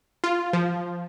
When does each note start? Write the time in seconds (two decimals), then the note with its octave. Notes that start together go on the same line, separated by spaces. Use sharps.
0.24 F4
0.53 F3